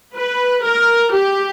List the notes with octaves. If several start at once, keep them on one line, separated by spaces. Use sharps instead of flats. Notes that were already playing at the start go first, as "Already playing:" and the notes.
B4
A#4
G4